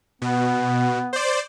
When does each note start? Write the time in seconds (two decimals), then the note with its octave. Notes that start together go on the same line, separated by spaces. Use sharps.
0.22 B2 B3
1.13 C5 D5